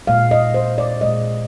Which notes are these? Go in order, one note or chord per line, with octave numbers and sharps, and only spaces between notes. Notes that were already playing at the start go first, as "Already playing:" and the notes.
A#2 G#3 F5
D#5
C5
D5
A#2 G#3 D#5